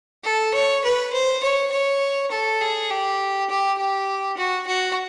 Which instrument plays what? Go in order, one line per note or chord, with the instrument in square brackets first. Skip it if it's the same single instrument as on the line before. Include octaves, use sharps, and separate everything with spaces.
[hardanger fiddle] A4
C#5
B4
C5
C#5
C#5
A4
G#4
G4
G4
G4
F#4
F#4